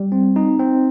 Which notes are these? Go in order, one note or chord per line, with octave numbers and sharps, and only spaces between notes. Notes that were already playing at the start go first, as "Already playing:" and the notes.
Already playing: G3
C4
D#4
C4